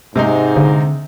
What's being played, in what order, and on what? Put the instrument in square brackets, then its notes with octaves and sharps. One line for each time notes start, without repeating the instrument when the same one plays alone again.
[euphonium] G#2 [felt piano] C3 G#3 D#4
[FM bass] D3